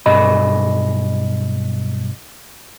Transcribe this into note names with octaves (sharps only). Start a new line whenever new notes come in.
B1 G2 D#5 B5